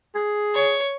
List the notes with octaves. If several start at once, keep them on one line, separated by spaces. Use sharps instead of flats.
G#4
C#5